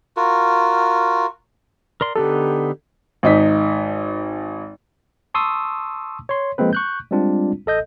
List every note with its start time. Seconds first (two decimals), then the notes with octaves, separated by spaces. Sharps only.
0.17 F4 F#4 A#4
2.01 A#4 D5 C6
2.16 D3 B3 D#4 G4 A4
3.23 G#1 D#4 B6
5.34 A5 C6 C#6 D#6 E6
6.29 C#5 C6
6.58 F3 G#3 A#3 C4 B4
6.73 C#6 F#6 G6
7.11 G3 G#3 C4 D4 F4
7.66 A1 A4 D#5 G6